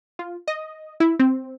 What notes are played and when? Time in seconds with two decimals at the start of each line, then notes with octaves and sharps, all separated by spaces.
0.19 F4
0.48 D#5
1.00 E4
1.19 C4